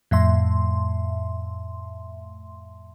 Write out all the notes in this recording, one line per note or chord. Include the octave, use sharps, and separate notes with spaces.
F2 A2 E5 C6